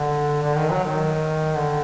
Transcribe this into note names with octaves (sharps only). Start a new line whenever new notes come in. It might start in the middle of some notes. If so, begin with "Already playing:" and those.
Already playing: D3
D3
D#3
F#3
D#3
D3